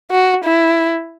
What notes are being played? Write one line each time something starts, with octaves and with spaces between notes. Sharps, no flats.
F#4
E4